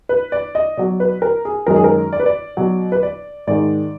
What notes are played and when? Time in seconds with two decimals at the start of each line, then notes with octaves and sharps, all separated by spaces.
0.09 B4
0.32 D5
0.55 D#5
0.77 B2 F#3 D5
1.00 B4
1.22 A#4
1.45 G#4
1.67 F#2 D#3 G#3 A#4
1.76 G#4
1.84 A#4
2.13 D5
2.20 B4
2.26 D5
2.57 B2 F#3
2.92 B4
3.03 D5
3.47 G#2 D#3 G#3 D5